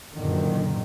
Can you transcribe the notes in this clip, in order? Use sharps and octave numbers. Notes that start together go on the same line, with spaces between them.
F#1 F#2 A#2 D3 D#3